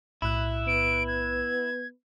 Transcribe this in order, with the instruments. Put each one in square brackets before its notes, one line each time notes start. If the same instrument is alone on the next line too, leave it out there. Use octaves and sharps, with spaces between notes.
[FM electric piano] B1 A2 F#6 [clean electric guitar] E4
[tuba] B3 [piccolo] D7
[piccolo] G#6